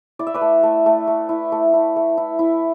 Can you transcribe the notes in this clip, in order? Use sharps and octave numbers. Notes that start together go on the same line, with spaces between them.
E4 D5
E5
B4 D5
A3
A3
A3
A3
E4
A3
E4
A3
E4
E4